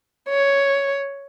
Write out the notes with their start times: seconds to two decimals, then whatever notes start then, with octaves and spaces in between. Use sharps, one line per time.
0.29 C#5